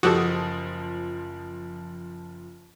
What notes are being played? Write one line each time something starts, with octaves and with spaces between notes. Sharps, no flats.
F#1 F3 F#4 G4 A4 D#6